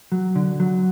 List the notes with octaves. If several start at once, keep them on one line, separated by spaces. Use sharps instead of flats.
F#3
D3
F#3